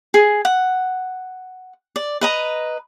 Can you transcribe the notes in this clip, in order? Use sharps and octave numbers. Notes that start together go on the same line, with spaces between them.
G#4
F#5
D5
B4 D#5 A#5